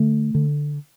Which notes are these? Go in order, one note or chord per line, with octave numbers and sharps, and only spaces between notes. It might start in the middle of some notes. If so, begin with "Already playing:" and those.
Already playing: D3 A3
D3